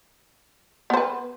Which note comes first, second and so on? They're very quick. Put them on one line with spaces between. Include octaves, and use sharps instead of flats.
B3 C5 B4